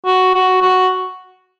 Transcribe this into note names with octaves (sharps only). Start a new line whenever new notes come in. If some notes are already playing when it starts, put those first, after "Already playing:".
F#4
F#4
F#4